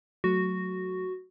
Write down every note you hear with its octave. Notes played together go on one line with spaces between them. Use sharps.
F#3 A3 F#4